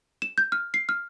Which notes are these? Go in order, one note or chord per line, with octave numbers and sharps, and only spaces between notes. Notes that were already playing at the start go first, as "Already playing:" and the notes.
E7
G6
F6
C7
F6